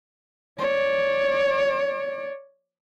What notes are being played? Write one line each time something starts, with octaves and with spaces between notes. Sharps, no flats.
C#5 D5